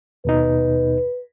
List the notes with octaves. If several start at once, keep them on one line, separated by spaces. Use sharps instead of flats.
D#2 B2 D#4 B4